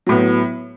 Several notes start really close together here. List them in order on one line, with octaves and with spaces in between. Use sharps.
F#3 A2 B3